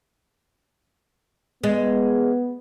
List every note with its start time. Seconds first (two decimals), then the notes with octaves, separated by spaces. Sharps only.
1.64 G#3 B3